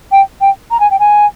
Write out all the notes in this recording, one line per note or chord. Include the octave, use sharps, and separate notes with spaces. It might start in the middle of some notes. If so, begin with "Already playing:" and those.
G5
G5
A#5
G#5
G5
G#5